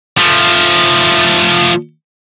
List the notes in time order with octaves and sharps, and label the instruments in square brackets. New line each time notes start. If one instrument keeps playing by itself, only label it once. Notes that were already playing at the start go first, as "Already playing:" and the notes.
[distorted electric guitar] F3 A3